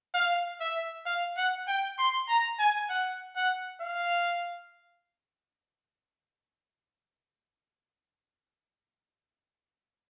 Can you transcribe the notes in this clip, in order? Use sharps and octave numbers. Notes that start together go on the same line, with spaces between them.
F5
E5
F5
F#5
G5
C6
A#5
G#5
F#5
F#5
F5